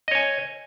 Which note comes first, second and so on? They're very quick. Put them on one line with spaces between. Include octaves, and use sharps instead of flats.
D#5 C#5 G#5